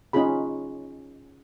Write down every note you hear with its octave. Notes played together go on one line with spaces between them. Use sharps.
C#4 D#4 F4 G#4 B5